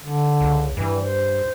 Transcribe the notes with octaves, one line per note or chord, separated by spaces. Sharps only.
D3
C#2
G2 E3
C5